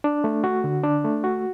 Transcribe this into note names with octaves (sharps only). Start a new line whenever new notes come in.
D4
A3
F#4
D3
D4
A3
F#4